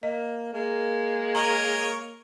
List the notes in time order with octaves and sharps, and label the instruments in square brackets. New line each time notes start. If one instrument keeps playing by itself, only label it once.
[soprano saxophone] A#3 [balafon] D#5
[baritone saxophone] G#3 [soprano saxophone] A#3
[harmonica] A#4 C#5 D#5 [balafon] A#5